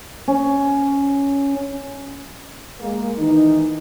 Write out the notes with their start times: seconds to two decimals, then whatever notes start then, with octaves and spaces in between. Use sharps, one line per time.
0.28 C#4
2.80 G#3 A#3
3.18 D#3 E3 D#4